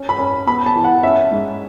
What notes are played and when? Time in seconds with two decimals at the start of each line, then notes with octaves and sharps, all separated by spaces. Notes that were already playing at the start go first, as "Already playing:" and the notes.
Already playing: C#4
0.09 B5
0.18 C#4
0.47 B3 B5
0.66 A5
0.76 E3
0.84 F#5
1.03 C#4 E5
1.31 G#2